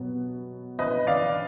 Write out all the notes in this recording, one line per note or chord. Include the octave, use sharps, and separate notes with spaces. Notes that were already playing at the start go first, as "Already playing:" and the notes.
Already playing: B2 F#3 B3
B4 D#5
D5 F5